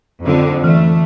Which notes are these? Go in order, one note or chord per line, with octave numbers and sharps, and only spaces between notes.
F2 D3
E3 A3